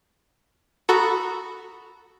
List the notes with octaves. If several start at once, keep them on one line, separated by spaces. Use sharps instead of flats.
F#4 A4 A#5 B5 D#6